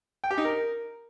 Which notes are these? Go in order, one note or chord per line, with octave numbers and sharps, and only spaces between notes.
G5
G4
D#4
A#4